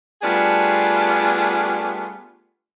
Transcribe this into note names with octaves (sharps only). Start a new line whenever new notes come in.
G3 A3 B3 D4 F4 G#4